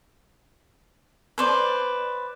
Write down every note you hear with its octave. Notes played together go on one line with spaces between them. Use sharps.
B4 C5 D5